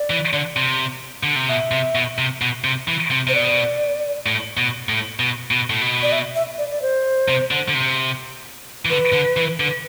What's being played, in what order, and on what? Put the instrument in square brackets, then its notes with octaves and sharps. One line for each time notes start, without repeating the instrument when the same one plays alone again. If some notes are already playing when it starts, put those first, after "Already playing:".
Already playing: [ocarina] D5
[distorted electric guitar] E3
D3
C3
D3
C3
[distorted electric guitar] B2 [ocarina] E5
[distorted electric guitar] C3
B2
C3
B2
C3
E3
C3
[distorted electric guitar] C3 [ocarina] C5
[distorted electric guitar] B2 [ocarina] D5
[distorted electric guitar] A2
B2
A2
B2
B2
A2
B2
[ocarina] D5
E5
E5
D5
D5
C5
[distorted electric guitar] C3
D3
D3
C3
E3
[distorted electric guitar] D3 [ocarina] B4
[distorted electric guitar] D3
E3
D3